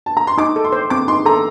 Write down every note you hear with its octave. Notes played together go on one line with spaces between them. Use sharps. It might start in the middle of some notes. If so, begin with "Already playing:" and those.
A5
A#5
C6
D#4 D6
A4
C6
C5
C4 D6
D#4 C6
A4 A#5